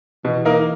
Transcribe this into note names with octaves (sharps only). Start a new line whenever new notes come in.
B2 E3
A#3 D#4 A#4